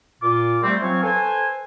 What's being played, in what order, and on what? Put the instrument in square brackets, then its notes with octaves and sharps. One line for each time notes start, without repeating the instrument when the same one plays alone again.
[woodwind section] A#2 F4 D6
G3 A3 C4
F3 F#3 C4 F5 G#5 C#6
A4 B4 C5 G#5